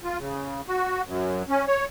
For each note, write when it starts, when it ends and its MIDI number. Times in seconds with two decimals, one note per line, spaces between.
0.04 0.18 65
0.18 0.61 49
0.68 1.02 66
1.06 1.43 42
1.49 1.65 61
1.67 1.86 73